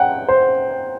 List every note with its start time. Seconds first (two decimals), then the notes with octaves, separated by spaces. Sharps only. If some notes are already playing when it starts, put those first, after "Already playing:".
Already playing: F#5 G5
0.28 C5